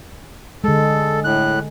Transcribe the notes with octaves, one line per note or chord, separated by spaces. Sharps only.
D3 G#3 A4
A2 F#6